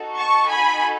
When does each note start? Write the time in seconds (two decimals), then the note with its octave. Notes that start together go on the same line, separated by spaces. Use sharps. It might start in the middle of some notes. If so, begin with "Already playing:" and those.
Already playing: D#4 F#4 A4
0.17 A5 C#6
0.47 G#5 B5